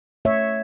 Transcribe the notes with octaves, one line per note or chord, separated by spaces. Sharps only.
A3 C#5 E5